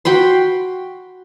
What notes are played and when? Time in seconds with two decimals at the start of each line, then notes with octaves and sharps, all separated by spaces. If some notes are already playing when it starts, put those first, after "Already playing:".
0.05 F#4 G5 B5 C6